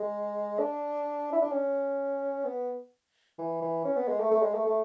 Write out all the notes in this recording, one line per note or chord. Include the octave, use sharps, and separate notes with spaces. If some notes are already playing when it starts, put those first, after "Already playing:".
Already playing: G#3
D4
E4
D4
C#4
B3
E3
E3
C#4
B3
G#3
A3
A3
G#3
A3
A3